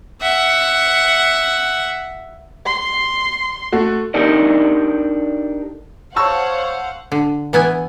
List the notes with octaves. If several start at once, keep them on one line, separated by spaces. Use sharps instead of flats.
E5 F#5
C6
A3 F#4
D4 D#4 G4 A4 A#4 D5
C5 C#5 F5 F#5 A5 C#6 E6
D3
E3 B3 E4 G#5